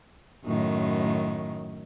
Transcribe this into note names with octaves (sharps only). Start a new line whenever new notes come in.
F#2 A2 D#3